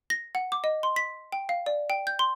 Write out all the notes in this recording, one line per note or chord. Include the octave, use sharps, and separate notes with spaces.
A#6
F#5
D6
D#5
C6
B6
G5
F5
D5
G5
G6
C6